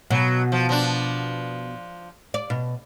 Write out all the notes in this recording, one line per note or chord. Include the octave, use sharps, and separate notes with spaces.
B2 F#3
F3
F3 D4
D5
B2